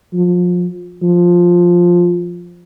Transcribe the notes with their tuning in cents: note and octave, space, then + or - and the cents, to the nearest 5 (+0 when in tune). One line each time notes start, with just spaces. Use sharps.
F3 +25
F3 +10